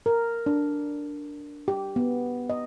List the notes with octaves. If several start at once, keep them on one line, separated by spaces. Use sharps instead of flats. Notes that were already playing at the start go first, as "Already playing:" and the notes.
A#4
D4
G4
B3
D#5